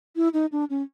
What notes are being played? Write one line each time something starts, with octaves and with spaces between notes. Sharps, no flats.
E4
D#4
D4
C#4